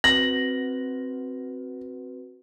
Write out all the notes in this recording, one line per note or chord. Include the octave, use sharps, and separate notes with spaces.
C4 F#4 B4 A#6 F#7